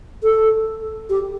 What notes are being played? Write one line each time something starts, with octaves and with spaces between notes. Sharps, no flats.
A4
G4